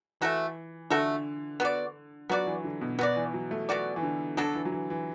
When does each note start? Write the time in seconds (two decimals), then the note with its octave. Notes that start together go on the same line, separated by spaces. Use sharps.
0.21 E3 A3 F#4 A4 E5
0.90 D3 A3 F#4 A4 E5
1.60 B3 F#4 D5
2.29 F#3 B3 F#4 D5
2.47 E3
2.65 D3
2.81 B2
2.99 B2 B3 F#4 D5
3.16 E3
3.34 F#3
3.51 A3
3.69 B3 F#4 D5
3.96 E3
4.03 D3
4.37 D3 F#3 D4 F#4 A4
4.55 E3
4.65 F#3
4.72 E3
4.90 E3